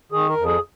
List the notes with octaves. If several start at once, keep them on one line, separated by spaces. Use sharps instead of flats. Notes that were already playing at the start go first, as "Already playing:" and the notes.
D#3 G#4
A#4
F2
G#4